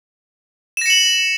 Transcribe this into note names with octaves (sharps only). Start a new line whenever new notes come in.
A#6 C#7 E7 F#7